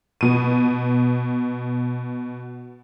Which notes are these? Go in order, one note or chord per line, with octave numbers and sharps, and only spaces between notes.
B2 D#7